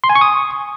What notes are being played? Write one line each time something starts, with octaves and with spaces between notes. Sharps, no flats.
C6
G#5
C#6
D#6